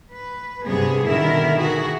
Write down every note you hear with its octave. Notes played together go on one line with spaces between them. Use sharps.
B4
G2 C3 B3 G#4
B2 D3 D#3 E4 A#4 E5
F#4 G#4